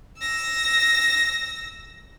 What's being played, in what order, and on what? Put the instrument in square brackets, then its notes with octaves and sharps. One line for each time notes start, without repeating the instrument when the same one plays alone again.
[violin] E6 A#6